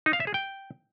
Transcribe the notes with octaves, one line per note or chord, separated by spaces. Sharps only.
D#4
F5
E5
G#4
G5